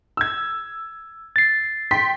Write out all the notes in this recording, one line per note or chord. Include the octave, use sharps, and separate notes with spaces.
E6 G#6
A6 C7
G5 C6 B6